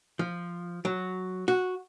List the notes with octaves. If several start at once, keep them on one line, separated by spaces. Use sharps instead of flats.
F3
F#3
F#4